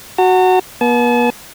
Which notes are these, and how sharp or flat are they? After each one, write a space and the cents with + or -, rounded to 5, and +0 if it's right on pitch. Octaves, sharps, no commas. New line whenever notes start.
F#4 +0 A#5 -45
B3 -40 A5 -40